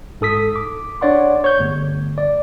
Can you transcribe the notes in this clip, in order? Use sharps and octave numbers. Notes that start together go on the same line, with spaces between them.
G#2 A4 D#6 B6
D6
D4 C#5 D5 F#5 C6
C#5 G6
G1 A3
D5